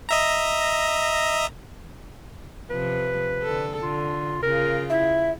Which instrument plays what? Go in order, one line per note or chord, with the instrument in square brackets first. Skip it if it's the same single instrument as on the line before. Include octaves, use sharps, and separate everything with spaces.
[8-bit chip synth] D#5 E5 A#5
[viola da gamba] C3 F3 [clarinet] B4
[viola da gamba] D3 A4
[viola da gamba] D3 [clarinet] F4
[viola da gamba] C#3 F4 [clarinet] A#4
[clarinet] E4 [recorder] E5